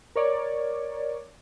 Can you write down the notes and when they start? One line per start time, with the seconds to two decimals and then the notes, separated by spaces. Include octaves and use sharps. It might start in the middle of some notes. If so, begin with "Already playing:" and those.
0.16 A#4 C#5 D5